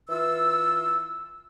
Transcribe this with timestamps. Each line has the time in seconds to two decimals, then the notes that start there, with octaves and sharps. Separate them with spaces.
0.09 E3 F4 E6